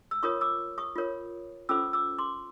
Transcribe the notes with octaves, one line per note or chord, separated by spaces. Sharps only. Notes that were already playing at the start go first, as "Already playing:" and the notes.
E6
F4 A#4 C#5 C#6 D#6
D6 E6
C#6 D#6
F4 A#4 C#5
C#4 F4 A4 C5 D6 E6
D6 E6
C6 D6